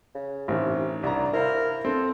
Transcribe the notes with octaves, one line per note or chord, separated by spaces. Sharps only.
C#3
A1 C3 D#3
C2 D4 A#5
E4 A#4 C5 F5
C4 A4